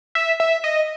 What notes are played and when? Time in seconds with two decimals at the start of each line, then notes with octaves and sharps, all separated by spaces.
0.15 E5
0.40 E5
0.64 D#5